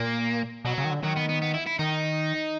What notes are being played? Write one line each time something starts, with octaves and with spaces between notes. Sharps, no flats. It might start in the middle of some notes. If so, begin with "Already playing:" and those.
Already playing: A#2 A#3
B2 F#3
C#3
D#3
D3
D#3 F#3
B3
B3
B3
E4
E4
D#3 D#4